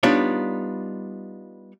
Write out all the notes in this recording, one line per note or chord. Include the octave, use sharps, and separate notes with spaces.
G3 B3 D4 D#4 F4 C#5